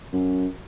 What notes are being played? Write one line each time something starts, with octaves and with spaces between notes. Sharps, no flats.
F#2